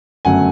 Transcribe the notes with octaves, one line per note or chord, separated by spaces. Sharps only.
G1 F#2 C#3 F#3 A3 F#5 G#5